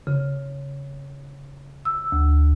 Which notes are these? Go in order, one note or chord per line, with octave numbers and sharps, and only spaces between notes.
C#3
E6
D2